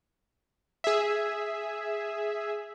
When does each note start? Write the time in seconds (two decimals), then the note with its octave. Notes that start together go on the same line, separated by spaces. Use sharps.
0.84 G#4 E5